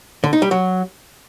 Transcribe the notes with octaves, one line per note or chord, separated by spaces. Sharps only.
D3
D#4
G3
F#3